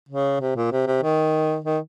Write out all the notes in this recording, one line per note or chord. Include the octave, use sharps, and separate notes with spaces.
C#3
C3
A#2
C3
C3
D#3
D#3